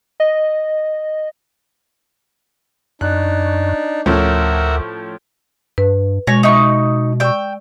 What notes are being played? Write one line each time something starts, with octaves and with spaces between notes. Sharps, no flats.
D#5
F#2 D4 D#4 F#6
D2 A2 F3 C#4 A#4 E5 F#5
G2 B4
B2 G#3 C#5 A#6
D#4 E5 C#6
D5 G5 C#6 E6